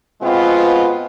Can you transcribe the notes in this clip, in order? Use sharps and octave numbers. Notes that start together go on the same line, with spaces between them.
B2 G#3 B3 C4 F4